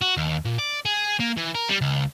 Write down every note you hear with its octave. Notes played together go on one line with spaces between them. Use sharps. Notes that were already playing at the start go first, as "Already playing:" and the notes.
F#4
D#2
A#2
D5
G#4
A#3
E3
A#4
G3
C#2